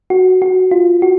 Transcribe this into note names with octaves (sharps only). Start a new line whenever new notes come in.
F#4
F#4
F4
F#4